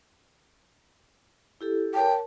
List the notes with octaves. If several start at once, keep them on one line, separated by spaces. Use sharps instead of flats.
E4 G4 A4
A#4 C#5 G5 A5